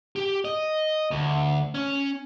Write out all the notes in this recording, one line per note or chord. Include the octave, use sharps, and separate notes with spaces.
G4
D#5
D2
C#4